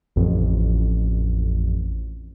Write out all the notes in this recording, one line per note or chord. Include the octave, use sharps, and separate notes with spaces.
A1 F2